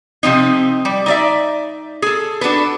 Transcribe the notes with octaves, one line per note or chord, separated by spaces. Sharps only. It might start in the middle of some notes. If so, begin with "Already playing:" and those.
C3 F3 C4 D#4
G3
D#4 D5 E5
G#4 A4
D4 F#4 A4 B4